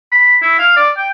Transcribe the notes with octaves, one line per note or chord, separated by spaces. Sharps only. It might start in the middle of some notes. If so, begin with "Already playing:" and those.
B5
E4
F5
D5
G5